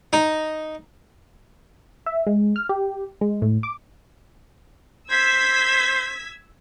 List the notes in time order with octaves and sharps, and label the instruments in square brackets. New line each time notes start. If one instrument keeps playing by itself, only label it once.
[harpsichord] D#4
[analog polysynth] E5
G#3
F6
G4
G#3
A2
D6
[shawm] C5 [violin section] E6 G#6 B6